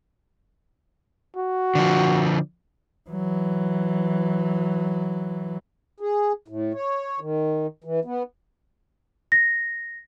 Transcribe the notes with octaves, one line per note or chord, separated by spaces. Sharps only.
F#4
D3 F3
E3 F#3
G#4
A2
C#5
D#3
E3
B3
A#6